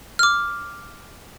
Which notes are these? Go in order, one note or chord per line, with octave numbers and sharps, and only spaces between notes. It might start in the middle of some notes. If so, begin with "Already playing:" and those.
D6 F6